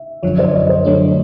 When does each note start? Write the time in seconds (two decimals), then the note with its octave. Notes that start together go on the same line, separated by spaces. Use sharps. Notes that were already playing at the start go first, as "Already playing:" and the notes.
Already playing: E5
0.23 F#2 D3 F3 C#5
0.38 C5 D5
0.54 C#5 D#5
0.69 C5
0.85 D3 F#3 A3 D4 C#5